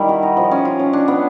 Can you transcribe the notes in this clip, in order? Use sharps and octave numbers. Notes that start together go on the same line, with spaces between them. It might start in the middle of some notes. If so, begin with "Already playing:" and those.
Already playing: D#3 G3 E4
F#4
D#4
F3
C#4
F4
C#4
D4
B3